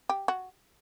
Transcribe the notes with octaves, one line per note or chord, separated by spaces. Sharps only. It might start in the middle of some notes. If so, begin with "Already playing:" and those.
G4
F#4